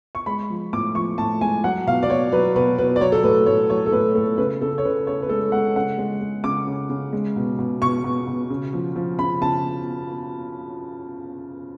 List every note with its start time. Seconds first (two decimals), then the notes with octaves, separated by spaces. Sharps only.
0.15 C#6
0.26 G#3 B5
0.50 F3
0.73 A2 D6
0.95 F3 C#6
1.18 A2 A5
1.41 G#3 G#5
1.64 F#3 F#5
1.87 B2 F5
2.03 D5
2.10 B2 C#5
2.32 F#3 B4
2.56 B2 B4
2.78 B2 B4
2.96 D5
3.01 F#3 C#5
3.12 A4
3.23 A2 B4
3.46 A2 C#5
3.70 F#3 C#5
3.86 A4
3.92 A2 B4
4.15 A2 A4
4.38 C#3 B4
4.61 C#3 A4
4.78 C#5
4.84 C#3 B4
5.07 C#3 C#5
5.22 B4
5.29 G#3 A4
5.52 G#3 F#5
5.76 C#3 F#5
5.98 G#3
6.21 G#3
6.44 C#3 D6
6.67 C#3
6.90 C#3
7.13 G#3
7.36 B2
7.59 B2
7.82 B2 C#6
8.04 B2
8.27 B2
8.50 C#3
8.73 F3
8.96 F3
9.19 C#3 B5
9.41 C#3 A5